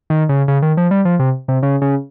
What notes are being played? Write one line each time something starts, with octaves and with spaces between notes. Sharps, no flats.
D#3
C#3
C#3
D#3
F3
G3
F3
C3
C3
C#3
C#3